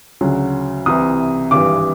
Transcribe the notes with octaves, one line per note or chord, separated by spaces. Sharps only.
D2 C#3 F#3
C2 C3 E3 D#6
G#1 G2 E3 G3 D6